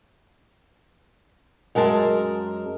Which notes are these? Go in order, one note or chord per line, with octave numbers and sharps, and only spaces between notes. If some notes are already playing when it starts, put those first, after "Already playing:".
F#2 G#3 A#4 A5